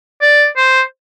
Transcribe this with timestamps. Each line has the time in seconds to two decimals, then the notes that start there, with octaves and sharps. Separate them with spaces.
0.22 D5
0.57 C5